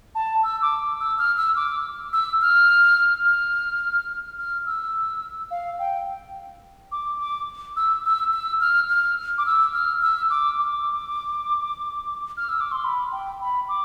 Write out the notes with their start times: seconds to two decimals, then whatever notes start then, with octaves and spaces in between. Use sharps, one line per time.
0.15 A5
0.43 E6
0.62 D6
1.00 E6
1.19 F6
1.38 E6
1.56 D6
2.13 E6
2.41 F6
3.25 F6
4.38 F6
4.66 E6
5.51 F5
5.79 G5
6.92 D6
7.20 D6
7.76 E6
8.05 E6
8.33 E6
8.60 F6
8.89 F6
9.38 D6
9.46 E6
9.74 F6
10.02 E6
10.30 D6
10.59 D6
12.37 F6
12.49 E6
12.60 D6
12.72 C6
12.84 B5
13.12 G5
13.41 B5
13.68 D6